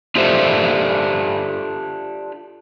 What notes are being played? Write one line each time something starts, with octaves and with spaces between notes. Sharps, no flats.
D4 F4 G4 A4 C5 E5